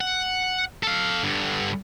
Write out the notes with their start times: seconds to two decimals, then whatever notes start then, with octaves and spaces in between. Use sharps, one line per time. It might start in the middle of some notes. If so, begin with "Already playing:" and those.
0.01 F#5
0.83 A4 F5
1.23 G2 D3